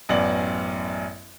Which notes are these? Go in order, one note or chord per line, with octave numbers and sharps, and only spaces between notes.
A1 F#2 B3 D5 F#7